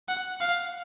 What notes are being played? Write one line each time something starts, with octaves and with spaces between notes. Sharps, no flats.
F#5
F5